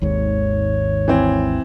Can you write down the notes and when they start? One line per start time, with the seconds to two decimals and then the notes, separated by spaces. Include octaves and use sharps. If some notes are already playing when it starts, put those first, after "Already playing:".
0.02 G#1 D#2 G#2 C#5
1.08 E3 C4